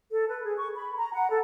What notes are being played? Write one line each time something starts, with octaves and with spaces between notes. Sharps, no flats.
A4
B4
G#4
C#6
B5
A#5
F#5
A4